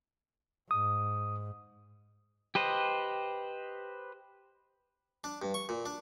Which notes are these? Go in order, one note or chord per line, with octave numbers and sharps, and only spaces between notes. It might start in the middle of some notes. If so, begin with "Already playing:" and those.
G#2 D#6
G4 B4 C5 D#5
D4
G2
C#6
A#2
D4